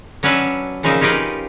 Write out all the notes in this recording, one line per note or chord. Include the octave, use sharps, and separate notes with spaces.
F#3 C#4 D4 B4 E5 F5
A#2 C#3 F3 D#4 E5
C#4 D#4 F4 G4 A#4 B4